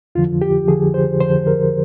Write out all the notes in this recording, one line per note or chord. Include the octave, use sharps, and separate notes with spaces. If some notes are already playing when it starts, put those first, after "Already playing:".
F2 D3 F3 F4
G4
F2 D3 F3 G#4
C5
F2 D3 F3 C5
A#4